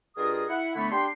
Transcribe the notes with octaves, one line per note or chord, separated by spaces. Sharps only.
G2 F4 G#4 A#4 D#5 D#6
E4 F#5
D3 A3 B3 C#5 B5
D4 G4 G5 C6